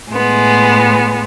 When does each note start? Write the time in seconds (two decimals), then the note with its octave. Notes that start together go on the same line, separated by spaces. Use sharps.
0.11 A2 G#3 B3